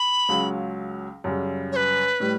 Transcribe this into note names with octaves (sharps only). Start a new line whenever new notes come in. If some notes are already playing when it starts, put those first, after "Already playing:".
Already playing: B5
C#2 C#3 F#3
F#2 C#3 G3
C#5
B4
A2 G3